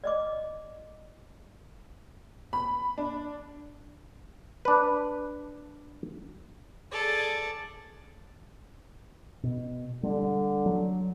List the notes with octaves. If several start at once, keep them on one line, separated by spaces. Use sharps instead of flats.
D5 D#5 D6
B5
D4
D4 B4
G#4 A4 D5
B2
D3 G3
F#3